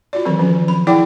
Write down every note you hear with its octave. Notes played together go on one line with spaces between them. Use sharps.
F4 F#4 D5
D#3 E3 F#3 C4 A4
F3 C#4
B5
E4 G#4 D5 F#5 G5 D6